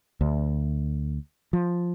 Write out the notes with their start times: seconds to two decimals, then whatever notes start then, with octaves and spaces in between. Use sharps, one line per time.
0.21 D2
1.53 F3